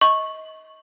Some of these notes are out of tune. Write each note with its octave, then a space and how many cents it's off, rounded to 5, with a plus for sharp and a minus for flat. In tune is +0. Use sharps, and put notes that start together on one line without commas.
D#5 +30 C#6 -10